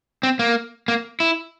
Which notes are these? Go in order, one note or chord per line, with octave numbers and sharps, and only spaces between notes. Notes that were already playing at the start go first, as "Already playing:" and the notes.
C4
A#3
A#3
E4